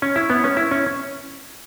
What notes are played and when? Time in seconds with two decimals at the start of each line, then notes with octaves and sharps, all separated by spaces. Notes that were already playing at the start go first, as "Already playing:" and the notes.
0.02 C#4
0.16 E4
0.30 B3
0.44 C#4
0.57 E4
0.71 C#4